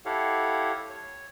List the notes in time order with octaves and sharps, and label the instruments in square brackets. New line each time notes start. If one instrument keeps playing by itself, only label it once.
[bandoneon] E4 G4 A4 C#5 F5 F#5
C#5